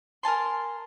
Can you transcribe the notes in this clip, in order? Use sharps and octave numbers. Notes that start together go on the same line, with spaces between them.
A#4 G#5 A5 C6